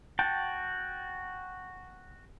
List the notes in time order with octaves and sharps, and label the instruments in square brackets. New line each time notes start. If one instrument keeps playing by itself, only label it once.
[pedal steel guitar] F#4 G5 A5